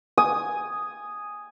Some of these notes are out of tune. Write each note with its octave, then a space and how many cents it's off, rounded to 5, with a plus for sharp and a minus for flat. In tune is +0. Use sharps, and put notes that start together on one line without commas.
G#5 +0 D#6 +0